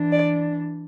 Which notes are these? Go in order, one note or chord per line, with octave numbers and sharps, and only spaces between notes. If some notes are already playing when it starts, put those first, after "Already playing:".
Already playing: E3 D4
D5